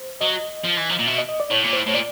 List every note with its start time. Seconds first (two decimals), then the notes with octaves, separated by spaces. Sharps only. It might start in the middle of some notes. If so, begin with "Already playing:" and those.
Already playing: C5
0.21 F#3 D#5
0.64 F3
0.77 E3
0.90 F3
0.99 A#2
1.07 B2 E5
1.18 D#5
1.29 D#5
1.40 D5
1.51 A2 C#5
1.64 A#2
1.73 A2 C5
1.87 A2 C#5
1.94 A#2 D5